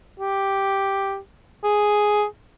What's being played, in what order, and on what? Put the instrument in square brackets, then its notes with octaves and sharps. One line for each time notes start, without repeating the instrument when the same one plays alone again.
[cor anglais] G4
G#4